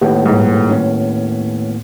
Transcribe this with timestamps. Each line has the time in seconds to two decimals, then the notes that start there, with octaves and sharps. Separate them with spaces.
0.01 D#2 A2 B3 G4
0.26 D#1 G#2
0.70 C#4